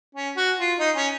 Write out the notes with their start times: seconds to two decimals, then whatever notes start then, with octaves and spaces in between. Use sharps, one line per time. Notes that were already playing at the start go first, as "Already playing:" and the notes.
0.15 C#4
0.36 F#4
0.59 F4
0.79 D#4
0.96 C#4